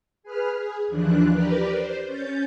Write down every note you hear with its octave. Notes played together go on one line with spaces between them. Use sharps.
G#4 B4 F6
G#4
D#2 E3 F3 D4 F#6
G4 A#4 B4 D5
C5
C#4 G6 A6